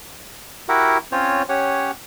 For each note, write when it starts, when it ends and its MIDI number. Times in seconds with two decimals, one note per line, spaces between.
0.69 0.98 64
0.69 0.98 66
0.69 0.98 67
0.69 0.98 70
0.69 0.98 76
0.69 0.98 78
1.12 1.42 60
1.12 1.42 61
1.12 1.42 65
1.12 1.42 72
1.12 1.42 73
1.49 1.91 61
1.49 1.91 67
1.49 1.91 73
1.49 1.91 78